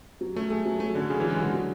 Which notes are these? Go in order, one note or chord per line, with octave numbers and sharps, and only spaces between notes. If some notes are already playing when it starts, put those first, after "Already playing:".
F#3
A3 C#4
A3 G#4
F#3
F#3 A3
D3 C#4
C#3 G#4
E3
F#3
G#3
D3
F#3